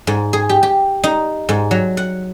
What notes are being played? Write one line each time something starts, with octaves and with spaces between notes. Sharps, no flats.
G#2
G#4
G4
G4
D#4
G#2
F#3
F#5